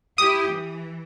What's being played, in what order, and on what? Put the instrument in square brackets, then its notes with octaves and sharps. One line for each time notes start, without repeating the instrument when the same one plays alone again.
[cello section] E4 G4 [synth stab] D#6
[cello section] E3